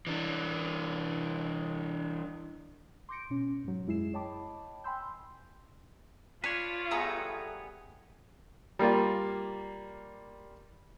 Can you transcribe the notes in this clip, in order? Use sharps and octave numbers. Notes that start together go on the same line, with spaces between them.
E3 D4
C6 D6 G6 A#6 C#7 D7
B2 C#4
G#2 F#3
F#2 G#3 E4 G#4 C7 E7
C#5 D#5 G5 A5 B5 D6
G5 G#5 B5 C6 E6 G6
D4 F4 B4 C#5
G3 A3 B3 G#4 A#5 E6
G3 A#3 F4